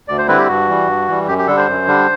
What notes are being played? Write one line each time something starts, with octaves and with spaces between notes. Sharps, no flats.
D2 D5
C5
D3 G3 C4 E4 B4
G4
G2 F#4
E3 G3
G2
E3 G3
F#2 G4
G4
D3 G3 D4 A4
C5
F#2
D3 G3 D4